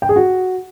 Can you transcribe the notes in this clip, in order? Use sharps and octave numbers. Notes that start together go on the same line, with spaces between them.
G5
G#4
F#4